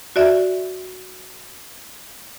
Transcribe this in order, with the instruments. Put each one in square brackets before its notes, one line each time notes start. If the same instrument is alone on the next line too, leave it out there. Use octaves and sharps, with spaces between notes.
[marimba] F#4 D5 E5